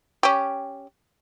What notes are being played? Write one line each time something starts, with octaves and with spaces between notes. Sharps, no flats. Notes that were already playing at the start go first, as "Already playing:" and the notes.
C#4 G4